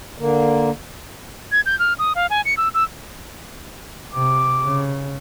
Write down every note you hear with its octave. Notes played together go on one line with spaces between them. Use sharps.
D3 A#3
G#6
G6
F6
D#6
F5
G#5
C#7
E6
E6
C3 D6
C#3